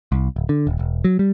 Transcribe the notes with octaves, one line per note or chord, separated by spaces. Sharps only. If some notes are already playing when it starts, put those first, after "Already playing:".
C2
D1
D3
D#1
E1
F#3
G3